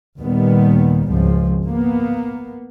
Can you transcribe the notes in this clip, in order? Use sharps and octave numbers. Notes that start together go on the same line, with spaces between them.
D#2 A#2 D#3 G3 B3
G#1 C#2 F3
A#3 B3